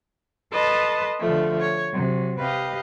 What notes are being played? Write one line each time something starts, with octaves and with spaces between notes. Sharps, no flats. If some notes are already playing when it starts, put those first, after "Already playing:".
A4 B4 D#5 A5 C6
D3 F3 A3
C#5
C3 F#3
G4 B4 D#5 F5